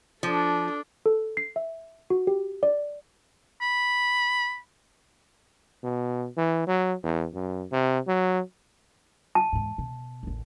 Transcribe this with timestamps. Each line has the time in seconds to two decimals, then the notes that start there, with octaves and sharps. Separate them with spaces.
0.23 F3 D4 A4
1.06 A4
1.37 C7
1.56 E5
2.10 F#4
2.27 G4
2.63 D5
3.61 B5
5.83 B2
6.37 E3
6.67 F#3
7.03 E2
7.34 F#2
7.72 C3
8.07 F#3
9.35 A5
9.53 E2 G#2
9.78 B2
10.23 A1 D#2